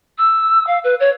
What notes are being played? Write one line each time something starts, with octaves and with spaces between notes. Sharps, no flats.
E6
F5
B4
C#5